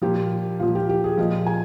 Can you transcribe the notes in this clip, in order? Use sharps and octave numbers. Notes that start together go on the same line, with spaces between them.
A#2 F3 G4
A#2 F3 F4
G4
G4
G#4
A#2 F3 D#5
G#5